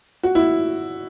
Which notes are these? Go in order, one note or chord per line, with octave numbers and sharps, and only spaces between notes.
F#4
E4